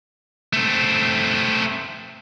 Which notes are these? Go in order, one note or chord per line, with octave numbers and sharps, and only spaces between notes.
A3 C4